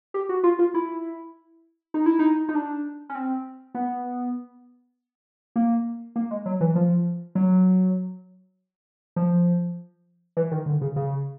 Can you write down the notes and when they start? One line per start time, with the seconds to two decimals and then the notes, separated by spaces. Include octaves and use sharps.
0.14 G4
0.29 F#4
0.44 F4
0.59 F4
0.74 E4
1.94 D#4
2.06 E4
2.19 D#4
2.49 D#4
2.55 D4
3.09 C#4
3.15 C4
3.75 B3
5.56 A#3
6.16 A#3
6.31 G#3
6.46 F#3
6.61 E3
6.75 F3
7.35 F#3
9.16 F3
10.37 E3
10.51 D#3
10.66 D3
10.81 C#3
10.96 C#3